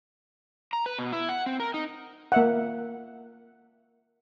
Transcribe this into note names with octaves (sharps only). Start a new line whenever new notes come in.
A#5
B4
B2
E4
F#5
C4
A#4
D#4
A#3 E5 F#5